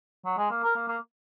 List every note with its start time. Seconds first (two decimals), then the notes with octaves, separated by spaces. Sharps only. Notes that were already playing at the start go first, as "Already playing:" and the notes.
0.25 F#3
0.38 G#3
0.51 A#3
0.63 A#4
0.76 A#3
0.88 A#3